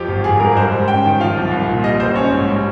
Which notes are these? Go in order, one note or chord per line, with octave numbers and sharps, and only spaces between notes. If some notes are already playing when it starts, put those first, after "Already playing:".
Already playing: F2 F3 G4
G#1
G#1 G#4
G2 A#4
G3 C5
G#2
C#4 G5
D#3
F3 F5
C2
C2
A#2
G3 D#5
A#1 C5
C#4 C#5
G#2
G3